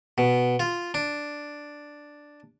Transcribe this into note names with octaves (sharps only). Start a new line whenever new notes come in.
B2
F4
D4